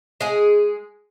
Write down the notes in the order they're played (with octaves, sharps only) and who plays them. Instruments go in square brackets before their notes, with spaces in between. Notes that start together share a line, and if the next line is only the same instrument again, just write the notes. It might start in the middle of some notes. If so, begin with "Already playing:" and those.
[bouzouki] G#3 G#4